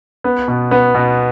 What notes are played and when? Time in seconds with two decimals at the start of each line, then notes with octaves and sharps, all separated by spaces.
0.24 B3
0.48 B2
0.71 B3
0.95 B2